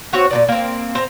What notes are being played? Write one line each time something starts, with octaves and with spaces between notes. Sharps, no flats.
C4 F#4 C#5 F#5
A#2 D#3 D5
A#3 C4
C4 A#5